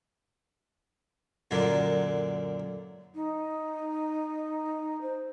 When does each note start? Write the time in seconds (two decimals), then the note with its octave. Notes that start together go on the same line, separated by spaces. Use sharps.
1.51 F#2 A#2 D3
3.15 D#4
5.01 C5